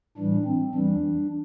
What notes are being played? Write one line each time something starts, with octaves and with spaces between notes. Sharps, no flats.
A2 E3 G3 D4
C4
E2 E3 G3 D4